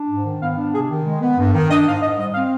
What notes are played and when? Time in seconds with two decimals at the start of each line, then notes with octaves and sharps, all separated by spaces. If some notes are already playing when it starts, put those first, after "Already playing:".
Already playing: D4
0.09 G#2
0.24 D#3
0.41 B3 F5
0.57 D4
0.73 C3 G#4
0.89 D#3
1.05 G#3
1.22 B3
1.38 G2
1.54 D#3
1.70 D4 D#5
1.86 G#2 F5
2.02 G#2 D#5
2.18 G3 D#5
2.34 C4 F5